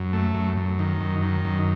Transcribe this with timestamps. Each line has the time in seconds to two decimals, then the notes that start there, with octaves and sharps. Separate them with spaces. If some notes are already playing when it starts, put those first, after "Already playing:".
Already playing: F#2
0.13 A3
0.35 F#2
0.57 F#2
0.79 D#3
1.01 F#2
1.23 D#3
1.45 F#2